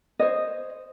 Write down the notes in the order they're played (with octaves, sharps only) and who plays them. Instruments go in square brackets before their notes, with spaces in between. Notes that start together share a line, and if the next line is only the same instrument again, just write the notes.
[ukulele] C5 C#5 D#5